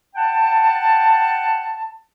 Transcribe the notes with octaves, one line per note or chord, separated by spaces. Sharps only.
F#5 G5 A5